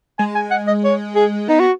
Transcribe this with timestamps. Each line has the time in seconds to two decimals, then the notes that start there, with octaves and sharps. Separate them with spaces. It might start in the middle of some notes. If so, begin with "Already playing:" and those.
0.19 G#3 G#5
0.35 G#5
0.51 F#5
0.67 D#5
0.84 C#5
1.15 G#4
1.48 B3 D#4
1.60 F#4